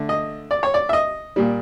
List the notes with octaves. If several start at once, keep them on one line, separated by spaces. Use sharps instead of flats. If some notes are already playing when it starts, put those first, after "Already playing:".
Already playing: D3 A3
D#5
D5
C#5
D5
E5
D#5
A#2 G3